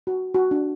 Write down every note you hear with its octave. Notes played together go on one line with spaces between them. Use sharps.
F#4
F#4
D4